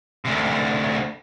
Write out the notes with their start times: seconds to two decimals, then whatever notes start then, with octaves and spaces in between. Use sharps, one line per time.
0.25 D2 C3